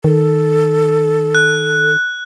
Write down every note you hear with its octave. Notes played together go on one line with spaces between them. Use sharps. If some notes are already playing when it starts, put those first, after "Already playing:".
D#3 A4
F#6